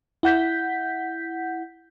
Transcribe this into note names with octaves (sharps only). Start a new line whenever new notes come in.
E4 F#5 G6 B6